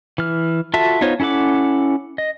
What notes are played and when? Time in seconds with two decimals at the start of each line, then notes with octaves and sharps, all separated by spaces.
0.18 E3 F6
0.74 F4 F#4 A4 E5 A5
1.01 B3 D#4 F4 C5 C#5
1.20 C#4 E4 A4 F#5 D6
2.18 D#5